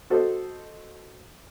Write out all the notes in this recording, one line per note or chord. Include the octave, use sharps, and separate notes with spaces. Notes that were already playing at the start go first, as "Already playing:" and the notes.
F#4 A4 C5 D#5